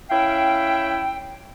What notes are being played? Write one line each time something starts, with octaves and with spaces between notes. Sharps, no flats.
C#4 E4 E5 F5 G5